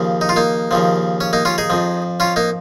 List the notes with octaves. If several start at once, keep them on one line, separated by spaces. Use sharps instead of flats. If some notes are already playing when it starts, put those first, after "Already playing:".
Already playing: D#2 C#3 F3
D#4
F4
A#3 D#4
D#2 C#3 F3
C#4
A#3 D#4
C#4 F4
D#4 G#4
F2 F3
C#4 F4
A#3 D#4